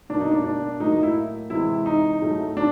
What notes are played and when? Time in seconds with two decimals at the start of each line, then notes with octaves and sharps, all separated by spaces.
0.09 B2 F#3 A#3 D4
0.20 D#4
0.31 D4
0.44 D4
0.80 A2 F#3 A#3 D#4
0.92 D#4
1.03 E4
1.50 C3 E3 G#3 E4
1.86 D#4
2.22 A2 F#3 A3
2.57 D4